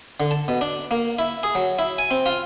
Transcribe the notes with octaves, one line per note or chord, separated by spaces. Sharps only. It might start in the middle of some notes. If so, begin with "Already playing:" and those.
D3
A5
B2
D4
A#3
E4
G#4
F#3
E4
G#5
C4
F4